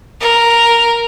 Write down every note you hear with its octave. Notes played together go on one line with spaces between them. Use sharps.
A#4